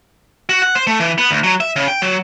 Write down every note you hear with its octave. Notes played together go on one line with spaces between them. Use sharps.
F#4
F#5
C5
A3
E3
B3
D2
F#3
E5
C#3
G5
F#3